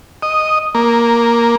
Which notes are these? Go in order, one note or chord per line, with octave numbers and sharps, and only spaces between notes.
D#5
A#3